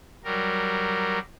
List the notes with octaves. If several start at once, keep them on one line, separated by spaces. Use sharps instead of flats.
F#3 G3 A#4